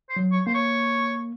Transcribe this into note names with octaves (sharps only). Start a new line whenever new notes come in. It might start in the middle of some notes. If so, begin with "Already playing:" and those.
C5
F#3
C#5
A#3 C5
C#5